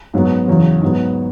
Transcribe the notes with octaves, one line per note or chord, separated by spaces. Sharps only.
G#2 F#3 B3
E2 C#3 F#3
G#2 F#3 B3